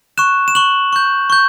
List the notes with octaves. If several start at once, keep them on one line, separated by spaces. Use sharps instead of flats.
C#6 F#6 E7
E7
C#6 F#6 F#7
C#6 G6
C#6 G6